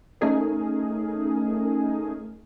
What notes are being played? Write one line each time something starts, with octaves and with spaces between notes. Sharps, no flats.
A3 C#4 D#4 G#4 A#4